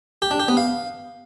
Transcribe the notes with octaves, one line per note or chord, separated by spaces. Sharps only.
G4
D4
G4
B3
F5